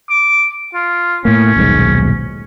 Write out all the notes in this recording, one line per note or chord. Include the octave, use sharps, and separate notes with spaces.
D6
F4
A2 A#3 C#4
D#1 B1 G#2